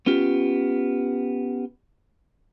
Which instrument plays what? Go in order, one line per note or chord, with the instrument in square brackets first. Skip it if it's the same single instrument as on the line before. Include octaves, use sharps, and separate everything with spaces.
[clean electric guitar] B3 C#4 F4 G4